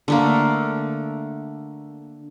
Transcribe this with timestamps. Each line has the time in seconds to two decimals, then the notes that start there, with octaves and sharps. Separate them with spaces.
0.08 D3 A3 A#3